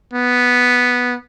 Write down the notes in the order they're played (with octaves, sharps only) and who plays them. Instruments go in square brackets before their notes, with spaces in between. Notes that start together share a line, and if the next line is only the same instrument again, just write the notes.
[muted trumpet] B3